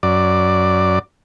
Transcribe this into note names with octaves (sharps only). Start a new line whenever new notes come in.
F#2 D5